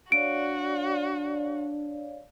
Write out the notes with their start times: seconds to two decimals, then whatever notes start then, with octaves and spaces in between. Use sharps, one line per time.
0.12 D4 F#4 C#5 D5 F5 D7